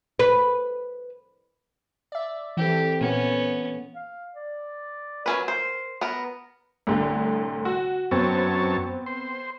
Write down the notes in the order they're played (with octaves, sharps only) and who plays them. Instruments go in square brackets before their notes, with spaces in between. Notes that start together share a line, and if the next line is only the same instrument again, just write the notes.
[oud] B4
[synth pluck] D5 E5
[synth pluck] E3 C4 A4 [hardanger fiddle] G4
[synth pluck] A#2 A#3 [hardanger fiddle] B3 C#4
[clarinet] F5
D5
[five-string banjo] F#3 C#4 B4 [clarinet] A#4
[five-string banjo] C5
[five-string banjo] B3 A#4 [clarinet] B4
[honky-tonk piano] C2 A2 D3
F#4
[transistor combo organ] F#2 C#5 A5 [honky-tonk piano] B3 C4
[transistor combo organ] C5